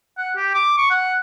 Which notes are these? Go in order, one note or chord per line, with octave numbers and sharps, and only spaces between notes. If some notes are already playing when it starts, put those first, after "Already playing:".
F#5
G4
D6
C#6
F#5